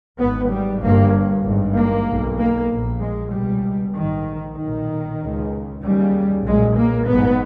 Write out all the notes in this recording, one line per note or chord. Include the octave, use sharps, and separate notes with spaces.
G#1 G#2 B3
G3
G1 G2 A#3
G#1 G2
A#3
B1 B2
A#3
A#1 A#2
G#3
C#2 B2 G3
A#1 G#2 D#3
B1 A#2 D#3
C#2 C#3
D#2 C#3 G3
B1 A#2 G#3
A#3
G#1 G#2 B3